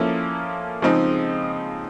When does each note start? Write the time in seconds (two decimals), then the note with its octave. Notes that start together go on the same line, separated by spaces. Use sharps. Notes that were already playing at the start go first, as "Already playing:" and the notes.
Already playing: F3 A#3 C#4 E4 A4
0.82 C#3 F3 G#3 C4 D#4